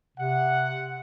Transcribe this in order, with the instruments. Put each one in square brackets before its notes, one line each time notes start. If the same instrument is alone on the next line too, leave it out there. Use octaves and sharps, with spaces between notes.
[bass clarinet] C3 [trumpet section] F#5